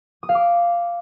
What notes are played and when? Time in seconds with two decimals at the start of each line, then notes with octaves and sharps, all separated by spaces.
0.23 D#6
0.29 F5
0.35 D6